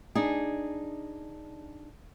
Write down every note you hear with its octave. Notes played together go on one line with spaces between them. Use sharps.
D4 D#4 G#4